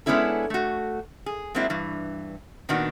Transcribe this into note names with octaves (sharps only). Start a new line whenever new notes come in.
G#3 B3 C#4 D4 E4 A4
A3 F#4
G#4
F#3 G#3 A#3 C4 D4 E4
G2 E3
A#2 D#3 B3 D4 F#4